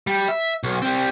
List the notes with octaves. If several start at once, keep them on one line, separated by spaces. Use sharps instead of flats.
G3
E5
B1
G3 C4